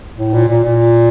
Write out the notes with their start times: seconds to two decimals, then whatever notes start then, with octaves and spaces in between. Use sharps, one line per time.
0.17 A2
0.34 A#2
0.48 A#2
0.64 A#2